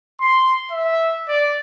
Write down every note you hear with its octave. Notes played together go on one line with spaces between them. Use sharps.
C6
E5
D5